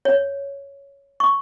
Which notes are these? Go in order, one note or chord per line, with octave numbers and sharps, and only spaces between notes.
C#5
C#6